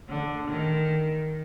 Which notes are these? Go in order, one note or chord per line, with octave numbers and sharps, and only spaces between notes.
D3
D#3